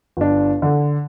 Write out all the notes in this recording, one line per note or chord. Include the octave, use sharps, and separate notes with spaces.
G1 D4
D3